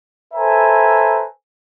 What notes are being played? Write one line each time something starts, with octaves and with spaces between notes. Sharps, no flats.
A4 B4 C5 E5 G#5 A#5